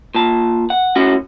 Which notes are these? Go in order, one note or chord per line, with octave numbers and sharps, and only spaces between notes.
A#2 A5
F#5
A2 C#4 F#4